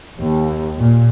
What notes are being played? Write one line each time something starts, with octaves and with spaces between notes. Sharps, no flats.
D#2
A#2